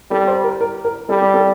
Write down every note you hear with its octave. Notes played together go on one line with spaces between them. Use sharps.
G3 A4
C5
A#4
A#4
A#4
G3 A4
G4
A4